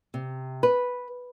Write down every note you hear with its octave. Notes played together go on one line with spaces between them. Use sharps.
C3
B4